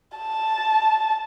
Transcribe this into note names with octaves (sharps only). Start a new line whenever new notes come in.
A5